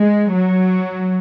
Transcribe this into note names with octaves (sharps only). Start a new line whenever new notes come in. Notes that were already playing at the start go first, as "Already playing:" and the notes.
Already playing: G#3
F#3